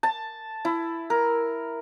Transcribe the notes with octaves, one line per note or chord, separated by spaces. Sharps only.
A5
E4
A#4